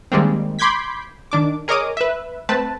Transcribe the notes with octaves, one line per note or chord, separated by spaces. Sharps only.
D#3 G3 G#3 A#3 C4
B5 C6 D6 G6 G#6 B6
D#3 D4 D6
G#4 A#4 C#5 D#5 D6 D#6
B4 E5
A3 C4 B4 A5